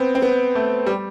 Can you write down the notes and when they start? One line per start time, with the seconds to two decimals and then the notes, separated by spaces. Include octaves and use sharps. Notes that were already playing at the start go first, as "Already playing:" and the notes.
Already playing: B3 C4
0.15 C4
0.22 B3
0.55 A3
0.86 G3